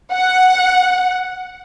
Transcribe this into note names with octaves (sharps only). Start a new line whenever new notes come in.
F#5